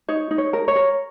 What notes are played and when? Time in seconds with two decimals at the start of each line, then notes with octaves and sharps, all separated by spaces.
0.09 D#4 C#5
0.31 D#4
0.38 C#5
0.53 A#4
0.68 C#5
0.76 A#4